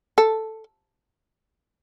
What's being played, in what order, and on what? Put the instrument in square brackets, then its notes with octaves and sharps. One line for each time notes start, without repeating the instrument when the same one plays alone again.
[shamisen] A4